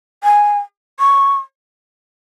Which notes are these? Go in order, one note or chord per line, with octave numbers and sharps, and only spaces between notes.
G#5
C#6